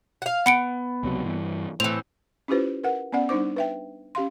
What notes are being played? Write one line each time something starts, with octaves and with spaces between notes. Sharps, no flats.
F5 F#5
B3 F#5 C#7 D7
C#2 C3 F#3
G2 E3
A2 E3 C4 F7
C#4 E4 F4 G4 B4 C5
A#4 B4 F#5
B3 C#4 D5 F#5
G3 D4 D#4 C5 D6
B4 E5 G5
C#4 G4 F5 C6